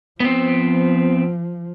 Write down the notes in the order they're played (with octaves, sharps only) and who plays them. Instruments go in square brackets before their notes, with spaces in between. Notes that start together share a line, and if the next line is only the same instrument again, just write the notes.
[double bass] F3 [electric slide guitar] B3 C4